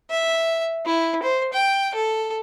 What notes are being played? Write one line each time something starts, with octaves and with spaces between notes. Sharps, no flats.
E5
E4
C5
G5
A4